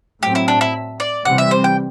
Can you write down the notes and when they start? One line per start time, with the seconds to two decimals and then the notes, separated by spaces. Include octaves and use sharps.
0.23 A2 F#3 C4 G4
0.35 E4
0.48 D4
0.61 E4
1.00 D5
1.25 C3 E3 G3 C4 F#5
1.38 E5
1.51 C5
1.64 G5